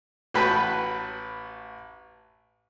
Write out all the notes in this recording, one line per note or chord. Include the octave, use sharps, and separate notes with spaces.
A1 F#4 B4 G5 A5 B5